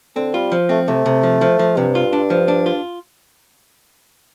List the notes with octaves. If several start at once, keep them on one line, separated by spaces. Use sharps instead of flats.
D3 C4
G3 F4
F3
A3 C4
C3 A3
C3
F3
F3
F3
G2 C3
F4
D4
F3
D4
F4